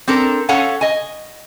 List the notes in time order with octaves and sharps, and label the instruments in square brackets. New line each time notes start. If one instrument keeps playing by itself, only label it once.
[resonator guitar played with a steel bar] C4 D4 A4 A#4
C#4 A4 C#5 F5 F#5 G#5
D#5 G#5